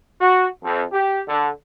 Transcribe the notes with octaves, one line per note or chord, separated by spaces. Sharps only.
F#4
F2
G4
D3